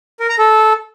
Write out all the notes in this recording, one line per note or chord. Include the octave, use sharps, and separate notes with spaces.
A#4
A#5
A4